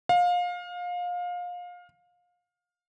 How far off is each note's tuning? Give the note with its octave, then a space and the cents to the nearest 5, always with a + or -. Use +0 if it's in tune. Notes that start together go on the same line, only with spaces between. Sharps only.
F5 +25